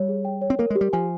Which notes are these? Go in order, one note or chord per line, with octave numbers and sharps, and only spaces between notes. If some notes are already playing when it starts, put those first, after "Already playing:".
Already playing: G3 C#5
G#4
G5
C#5
C4
A#3 A#4
G#3
G4
G3
F3 G#5